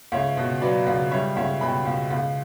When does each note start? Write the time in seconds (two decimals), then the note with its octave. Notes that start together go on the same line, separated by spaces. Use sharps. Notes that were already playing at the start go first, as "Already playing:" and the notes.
0.12 C#2 C#5 E5
0.37 B2
0.61 F#3 B4 D5
0.87 C#2
1.11 G3 C#5 E5
1.36 C#2 C#5 E5
1.61 B2 G5 B5
1.86 C#2
2.10 C#2